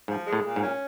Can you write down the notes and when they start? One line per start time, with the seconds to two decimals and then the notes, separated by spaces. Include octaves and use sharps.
0.08 G#2 F3
0.27 G#3
0.33 A2
0.45 A#2
0.56 G#2
0.63 C#4